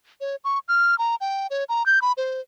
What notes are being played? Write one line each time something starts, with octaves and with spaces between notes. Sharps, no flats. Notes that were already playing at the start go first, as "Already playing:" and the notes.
C#5
C#6
F6
A#5
G5
C#5
A#5
G6
B5
C5